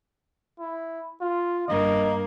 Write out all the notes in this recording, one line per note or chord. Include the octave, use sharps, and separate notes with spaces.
E4
F4
G2 A#3 D#5